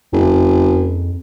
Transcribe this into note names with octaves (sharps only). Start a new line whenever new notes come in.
F#1 F2